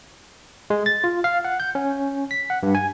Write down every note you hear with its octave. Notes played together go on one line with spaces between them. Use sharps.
G#3
A6
F4
F5
F#5
G6
C#4
B6
F#5
G2
G#5